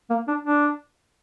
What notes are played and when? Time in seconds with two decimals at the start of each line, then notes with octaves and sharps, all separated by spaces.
0.10 A#3
0.28 D4
0.45 D4